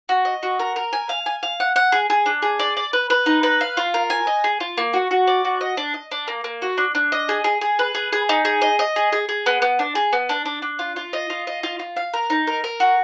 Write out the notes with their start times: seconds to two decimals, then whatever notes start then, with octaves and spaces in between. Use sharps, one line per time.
0.09 F#4
0.25 D#5
0.43 F#4
0.59 A#4
0.76 A#4
0.93 G#5
1.09 F5
1.26 G#5
1.43 F5
1.60 F#5
1.76 F#5
1.92 G#4
2.10 G#4
2.26 D4
2.42 G#4
2.60 D5
2.77 D5
2.93 B4
3.10 B4
3.26 D#4
3.43 B4
3.61 F5
3.77 F4
3.94 A#4
4.10 G#5
4.27 D#5
4.44 G#4
4.60 F4
4.78 A#3
4.93 F#4
5.11 F#4
5.27 D5
5.45 F#4
5.61 D#5
5.77 D4
5.94 D#5
6.12 D4
6.28 A#3
6.44 A#3
6.62 F#4
6.78 D4
6.95 D4
7.12 D#5
7.29 G#4
7.44 G#4
7.61 G#4
7.79 B4
7.95 G#4
8.12 G#4
8.29 D#4
8.45 G#4
8.62 D#5
8.79 D#5
8.96 G#4
9.12 G#4
9.29 G#4
9.46 B3
9.62 B3
9.79 D4
9.95 G#4
10.13 B3
10.29 D4
10.45 D4
10.62 D4
10.79 F4
10.96 F4
11.13 D#5
11.30 F4
11.47 D#5
11.63 F4
11.79 F4
11.96 F5
12.14 A#4
12.30 D#4
12.47 A#4
12.64 A#4
12.80 F#4